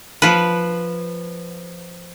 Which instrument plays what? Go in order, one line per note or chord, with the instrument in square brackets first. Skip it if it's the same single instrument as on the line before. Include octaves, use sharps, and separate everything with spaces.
[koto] F3 B4